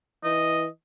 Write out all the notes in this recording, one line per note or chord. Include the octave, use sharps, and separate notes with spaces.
E3 D#5